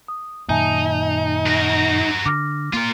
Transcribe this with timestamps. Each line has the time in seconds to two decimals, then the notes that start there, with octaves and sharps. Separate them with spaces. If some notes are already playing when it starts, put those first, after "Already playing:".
0.08 D#6
0.49 F#2 A#2 D#3 D#4 E5 G#5 A5
1.46 F#4 A#4
2.26 D3 D6 F6 A#6
2.73 A#3 F4 A#4